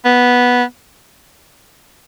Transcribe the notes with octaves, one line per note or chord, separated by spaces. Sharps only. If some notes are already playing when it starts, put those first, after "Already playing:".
B3